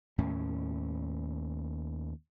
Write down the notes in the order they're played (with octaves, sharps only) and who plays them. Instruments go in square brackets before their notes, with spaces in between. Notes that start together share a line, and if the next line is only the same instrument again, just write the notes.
[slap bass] D#2 A2 C#4